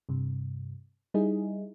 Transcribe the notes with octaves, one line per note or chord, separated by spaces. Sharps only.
G2 C3
G3 D#4 E4 G#4